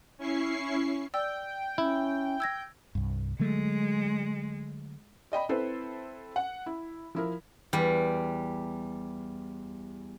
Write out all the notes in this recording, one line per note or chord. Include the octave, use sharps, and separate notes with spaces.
C#4 E4 C#6 C7
D5 G5 E6
C#4 E4
E6 G#6 A#6
C2 G2
D3 F#3 G#3 A3
D5 D#5 G5 B5
C4 E4 A4 B4 C5
F#5
E4
F3 E4 A#4
E2 G3